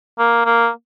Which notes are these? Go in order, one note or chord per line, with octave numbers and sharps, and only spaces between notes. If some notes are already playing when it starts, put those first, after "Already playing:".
A#3
A#3